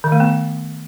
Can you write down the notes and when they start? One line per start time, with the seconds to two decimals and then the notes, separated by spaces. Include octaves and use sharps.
0.04 D#3
0.12 A3
0.20 B3